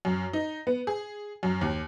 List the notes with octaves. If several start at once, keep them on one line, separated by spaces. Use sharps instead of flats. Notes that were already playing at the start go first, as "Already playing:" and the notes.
F#2
D#4
B3
G#4
F#2
D#2